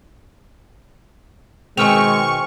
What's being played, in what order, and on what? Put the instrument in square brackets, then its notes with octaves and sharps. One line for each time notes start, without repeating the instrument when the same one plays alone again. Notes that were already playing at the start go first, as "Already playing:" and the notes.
[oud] B2 D#3 C4 [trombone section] G#3 [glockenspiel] G#5 F6 F7 [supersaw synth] C#6